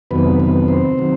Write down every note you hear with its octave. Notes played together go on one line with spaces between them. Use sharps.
F2 C3 D#3 F#3 B3 B4
B3 B4
C4 C5
C3 D#3 F#3